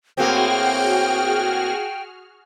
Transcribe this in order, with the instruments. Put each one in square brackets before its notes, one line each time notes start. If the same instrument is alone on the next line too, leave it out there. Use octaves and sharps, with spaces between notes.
[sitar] A2 A#3 C4 [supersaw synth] F#4 G#4 F6 [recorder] G5